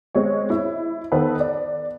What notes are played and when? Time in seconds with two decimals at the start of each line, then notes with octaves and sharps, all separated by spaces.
0.15 G#3 C4 C#5
0.50 E4
1.12 D#3 B3 A4 B4 C5
1.40 D5